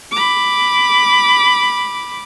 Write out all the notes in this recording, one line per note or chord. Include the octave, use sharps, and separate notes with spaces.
B5 D6